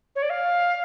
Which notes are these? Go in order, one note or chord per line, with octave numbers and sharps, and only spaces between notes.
C#5
D5
F5